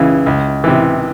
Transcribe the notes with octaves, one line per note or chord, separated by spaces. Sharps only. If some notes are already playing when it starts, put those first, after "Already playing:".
Already playing: C#2 C#3 E3
C#2
C3 E3